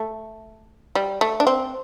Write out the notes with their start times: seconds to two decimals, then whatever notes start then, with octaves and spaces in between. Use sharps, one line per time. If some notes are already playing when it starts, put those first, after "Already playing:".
Already playing: A3
0.95 G3
1.21 A3
1.40 D4
1.47 C4